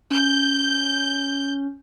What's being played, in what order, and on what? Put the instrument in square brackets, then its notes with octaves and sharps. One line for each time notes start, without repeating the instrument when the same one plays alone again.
[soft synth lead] C#4 [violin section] G6